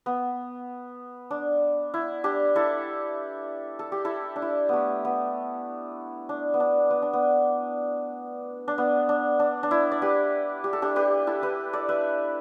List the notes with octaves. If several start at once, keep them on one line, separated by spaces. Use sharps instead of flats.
B3
D4
E4
D4 G4
E4 A4
A4
G4
E4 A4
D4
E4
A3 B3
B3
D4
B3
D4
B3
D4
B3
D4
B3
D4
D4
D4
E4
D5
G4 B4
G4
A4
D4 G4
G4 B4
E4 A4
G4 B4
A4 D5
B4 E5